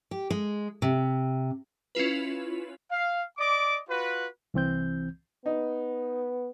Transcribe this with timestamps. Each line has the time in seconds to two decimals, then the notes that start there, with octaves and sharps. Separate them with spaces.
0.11 G4
0.30 G#3
0.82 C3
1.95 C#4 E4 F4 B4
2.90 F5
3.38 D5 D#5 D6
3.89 F4 F#4 B4
4.54 C2 E3 C4 G6
5.46 B3 D#4